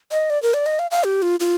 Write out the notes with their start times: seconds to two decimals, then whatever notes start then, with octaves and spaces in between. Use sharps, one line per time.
0.11 D#5
0.30 D5
0.43 A#4
0.54 D5
0.66 D#5
0.79 F5
0.91 F5
1.04 G4
1.22 F4
1.40 F4